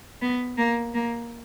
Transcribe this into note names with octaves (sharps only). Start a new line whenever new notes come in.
B3
A#3
A#3